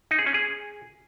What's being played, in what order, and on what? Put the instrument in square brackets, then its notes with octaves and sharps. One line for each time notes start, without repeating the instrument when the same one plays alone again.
[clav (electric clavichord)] D#4
G#4
C#4
G#4